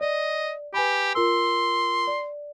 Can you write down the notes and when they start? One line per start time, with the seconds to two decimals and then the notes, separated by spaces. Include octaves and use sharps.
0.01 D5 D#5
0.74 G4 B4 G#5 B5
1.15 F4 A#4 C6 E6
2.07 D5